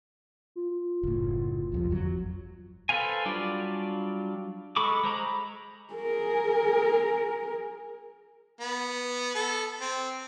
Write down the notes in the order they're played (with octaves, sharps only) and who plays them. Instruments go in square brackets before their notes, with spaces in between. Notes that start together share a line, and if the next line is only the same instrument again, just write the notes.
[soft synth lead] F4
[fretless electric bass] F#1 A2
C2 F2 C3
G1 F2 F#3
[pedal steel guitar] A4 B4 C5 F5 G#5
F#3 G3 D4 F4 D5
G#3 A4 B5 C#6 D6
G#3 C5 A#5 B5
[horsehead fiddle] G#4 A#4
[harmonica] B3
A4
C4